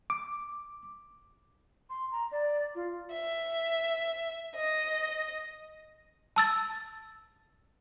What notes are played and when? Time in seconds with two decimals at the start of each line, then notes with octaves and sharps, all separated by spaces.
0.10 D6
1.90 C6
2.12 A#5
2.32 D5
2.75 F4
3.13 E5
4.56 D#5
6.36 A5 E6 A6